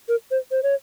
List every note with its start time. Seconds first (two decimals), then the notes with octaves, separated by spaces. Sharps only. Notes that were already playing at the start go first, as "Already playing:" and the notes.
0.09 A#4
0.31 C5
0.51 C5
0.63 C#5